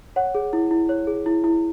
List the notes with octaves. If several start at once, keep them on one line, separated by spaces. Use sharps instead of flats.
C#5 F#5
G#4
E4
E4
C#5
G#4
E4
E4